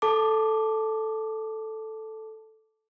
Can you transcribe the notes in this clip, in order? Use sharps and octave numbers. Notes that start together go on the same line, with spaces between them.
A4 A5 D6